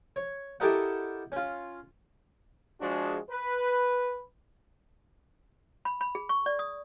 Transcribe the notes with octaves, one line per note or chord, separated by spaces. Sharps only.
C#5
E4 G4 A4 A#4 D#5 F#5
C#4 F4
F3 G#3 D4 F#4 G#4
B4
B5
B5
G#4
C#6
D5
D#6